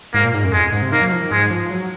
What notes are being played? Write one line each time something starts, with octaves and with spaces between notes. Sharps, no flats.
G#2 A#3
A#2
G#2
F#2
F2 G#3
G#2
C3
D#3 A#3
F#3
F3
D#3
G#2 G#3
F3
F#3